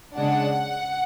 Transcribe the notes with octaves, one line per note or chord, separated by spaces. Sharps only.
C#3 G#3 D4 F#5